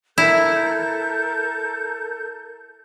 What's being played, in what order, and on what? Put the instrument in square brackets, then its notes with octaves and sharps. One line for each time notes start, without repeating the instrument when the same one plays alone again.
[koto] E4 [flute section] A4 A#4 G6